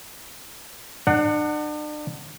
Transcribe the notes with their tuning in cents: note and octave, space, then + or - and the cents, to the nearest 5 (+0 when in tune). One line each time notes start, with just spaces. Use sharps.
D4 +40 F#5 +0